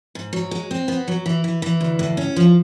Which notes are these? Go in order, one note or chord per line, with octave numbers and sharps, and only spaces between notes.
G#2
F#3
G#3
C4
B3
F#3
E3
E3
E3
D2
A2
C#4
F3